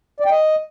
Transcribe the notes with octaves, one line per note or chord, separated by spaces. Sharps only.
D5
G5
D#5